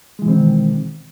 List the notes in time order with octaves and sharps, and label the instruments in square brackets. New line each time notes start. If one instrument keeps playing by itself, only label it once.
[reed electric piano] G#3
E3
B2
C4
D#3